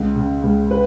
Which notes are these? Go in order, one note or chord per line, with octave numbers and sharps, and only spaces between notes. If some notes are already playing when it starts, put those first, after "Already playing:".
Already playing: C#2
C#3
C#2
B4